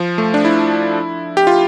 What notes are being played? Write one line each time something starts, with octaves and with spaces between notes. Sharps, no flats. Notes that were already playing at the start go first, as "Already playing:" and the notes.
Already playing: F3
A3
D4
E4
G4
F4